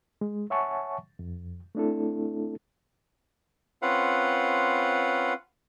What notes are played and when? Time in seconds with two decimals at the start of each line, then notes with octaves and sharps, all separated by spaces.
0.21 G#3
0.50 C#5 E5 F#5 G#5 A5 C#6
1.19 F2
1.75 A3 C4 D4 E4 A4
3.82 C4 C#4 F4 B4 F5 F#5